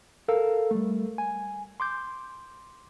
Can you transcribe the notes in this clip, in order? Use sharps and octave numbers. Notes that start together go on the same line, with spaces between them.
A4 A#4 F5 E6
G3 A3
G#5
C6 D6 G6